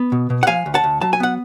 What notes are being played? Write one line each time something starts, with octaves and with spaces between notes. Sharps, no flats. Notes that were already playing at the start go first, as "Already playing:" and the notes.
Already playing: B3
B2
B2
F#5
F3 F5 G#5
D2
F#5 A5
D2
F#3 A5
G#5
B3 F#5